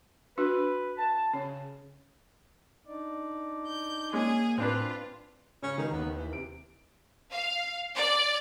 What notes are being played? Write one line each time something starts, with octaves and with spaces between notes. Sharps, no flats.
D4 F#4 B4
A5
C#3 C#4
D4 D#4 D5
G6
G#3 A#3 C#4 G#4 G#5
A2 C4 D4 F4 B4
C#3 C#4
D#3 D#4
D#2 B3
E3
C3 D7
F5
D5